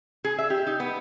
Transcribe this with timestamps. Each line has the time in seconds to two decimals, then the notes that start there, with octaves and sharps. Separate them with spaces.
0.25 G#4
0.39 E5
0.50 G4
0.67 D#4
0.80 B3